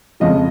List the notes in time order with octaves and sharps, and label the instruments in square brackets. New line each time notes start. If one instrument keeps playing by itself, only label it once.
[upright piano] F2 C#3 F3 G#3 D#5